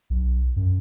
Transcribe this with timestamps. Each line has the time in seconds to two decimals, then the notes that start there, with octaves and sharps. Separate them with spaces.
0.10 B1
0.56 F#2